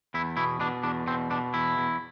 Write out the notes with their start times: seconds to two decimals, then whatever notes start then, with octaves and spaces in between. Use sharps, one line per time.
0.14 E2 E4
0.37 B2 E4
0.60 B2 D4
0.83 E2 D4
1.07 B2 C4
1.31 B2 D4
1.54 E2 E4
1.78 E2